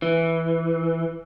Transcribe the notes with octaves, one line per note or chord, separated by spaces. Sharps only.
E3